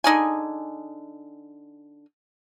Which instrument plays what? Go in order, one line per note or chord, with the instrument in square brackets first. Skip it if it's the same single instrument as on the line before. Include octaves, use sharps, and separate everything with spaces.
[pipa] D3 D#4 G#4 G#5